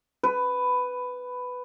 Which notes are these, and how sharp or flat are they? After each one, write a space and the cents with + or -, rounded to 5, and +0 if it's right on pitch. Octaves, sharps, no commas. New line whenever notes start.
B4 +10